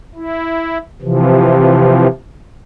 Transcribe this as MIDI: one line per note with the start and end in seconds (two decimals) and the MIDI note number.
0.15 0.78 64
1.02 2.07 48
1.02 2.07 52
1.02 2.07 53